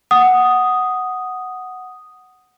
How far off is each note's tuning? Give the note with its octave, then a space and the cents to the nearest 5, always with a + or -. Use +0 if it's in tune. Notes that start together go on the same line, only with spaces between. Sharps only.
F#5 +0 D#6 +0